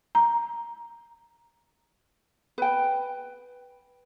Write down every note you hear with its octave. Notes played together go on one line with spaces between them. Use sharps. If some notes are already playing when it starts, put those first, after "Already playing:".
A#5
B4 G5